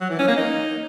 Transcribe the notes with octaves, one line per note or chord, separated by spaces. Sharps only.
F#3
E3
C#4
A#3
D#4